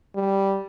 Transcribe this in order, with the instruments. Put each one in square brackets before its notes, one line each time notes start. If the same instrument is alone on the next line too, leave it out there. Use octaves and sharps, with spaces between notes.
[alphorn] G3